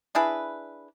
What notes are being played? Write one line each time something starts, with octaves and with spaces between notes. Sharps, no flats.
D4 E4 G#4 B4